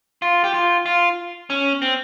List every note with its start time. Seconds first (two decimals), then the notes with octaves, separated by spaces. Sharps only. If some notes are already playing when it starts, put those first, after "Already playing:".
0.22 F4
0.44 G4
0.54 F4
0.86 F4
1.50 C#4
1.82 C4